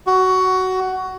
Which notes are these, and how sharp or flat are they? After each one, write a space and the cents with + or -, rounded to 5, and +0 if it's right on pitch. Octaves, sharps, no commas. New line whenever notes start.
F#4 +15